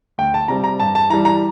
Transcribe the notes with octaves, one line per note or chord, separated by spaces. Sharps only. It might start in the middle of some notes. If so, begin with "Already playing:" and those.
D2 G5
A5
C3 G3 C4 A#5
A#5
G2 A5
A5
E3 G3 A#5
A#5